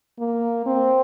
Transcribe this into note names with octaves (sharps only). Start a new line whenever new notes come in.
A#3
C4